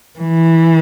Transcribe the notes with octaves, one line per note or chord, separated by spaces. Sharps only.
E3